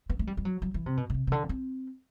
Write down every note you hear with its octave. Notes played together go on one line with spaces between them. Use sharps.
B3
A3
G3
G3
F#3
F#3
E3
C3
B2
B2
C3
C3
D3
C4